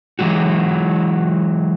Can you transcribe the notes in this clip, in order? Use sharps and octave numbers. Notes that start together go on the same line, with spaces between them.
E3 F#3 G#3 F#4